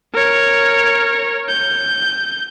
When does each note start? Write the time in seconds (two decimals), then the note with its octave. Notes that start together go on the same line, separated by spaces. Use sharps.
0.13 A#4 C#5
1.48 G6